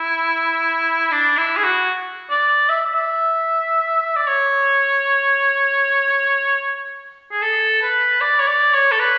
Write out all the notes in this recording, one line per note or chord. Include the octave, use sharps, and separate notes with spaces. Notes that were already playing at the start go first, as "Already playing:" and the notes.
Already playing: E4
D4
E4
G#4
F#4
D5
E5
E5
D5
C#5
G#4
A4
B4
D5
C#5
D5
C#5
A4
B4